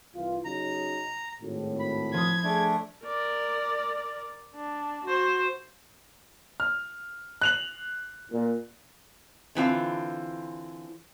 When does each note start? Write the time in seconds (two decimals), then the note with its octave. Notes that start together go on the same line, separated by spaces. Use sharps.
0.15 C2 E3 F4
0.45 C#3 F#3 D#4 A#5
1.40 G#1 A2
1.79 B5
2.14 F3 D#6 G#6
2.44 A3 D4 G#4
3.05 A#4 D5
4.55 D4
5.05 F#4 C5
6.60 F6
7.42 F#6 F7 F#7
8.32 A#2
9.55 D3 E3 C4 F4